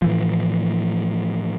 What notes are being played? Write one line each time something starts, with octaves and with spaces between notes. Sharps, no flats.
A2 E3 F3